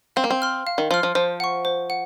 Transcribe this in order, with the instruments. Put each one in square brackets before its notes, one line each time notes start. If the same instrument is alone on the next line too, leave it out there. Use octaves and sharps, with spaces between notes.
[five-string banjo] C4 [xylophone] F5
[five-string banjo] A#3
C4
[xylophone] C6 F6
F5
[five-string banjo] D#3
[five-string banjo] F3 [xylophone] C6 F6
[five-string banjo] F3
[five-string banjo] F3 [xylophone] C5
[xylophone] F#5 C#6
C5
F#5